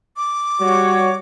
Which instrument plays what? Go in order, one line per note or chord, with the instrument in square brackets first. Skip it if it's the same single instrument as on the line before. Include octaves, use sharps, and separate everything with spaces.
[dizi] D6
[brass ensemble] G3 F#4 C#5